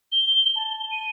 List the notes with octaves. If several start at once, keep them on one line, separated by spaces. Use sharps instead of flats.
G7
A5
D#7